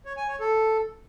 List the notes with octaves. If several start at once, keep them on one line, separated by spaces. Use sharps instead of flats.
C#5
G#5
C#5
A4